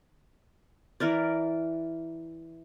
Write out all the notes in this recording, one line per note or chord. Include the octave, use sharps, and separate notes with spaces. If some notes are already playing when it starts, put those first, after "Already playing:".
E3 A#4 D5